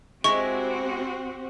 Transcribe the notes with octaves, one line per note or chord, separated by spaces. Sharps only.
G#3 C4 E4 F#4 G4 C#6